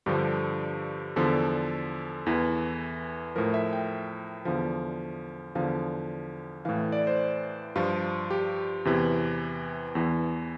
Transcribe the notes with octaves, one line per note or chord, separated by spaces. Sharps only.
G2 D3 F3 G4
E2 D3 F3 A4
E2 E3
A2 F3 A#4
E5
G5
E2 D3 F3 F5
E2 D3 F3 F5
A2 E3 F5
D5
C5
G2 F3 F4
G4
E2 C3 E3
E2 E3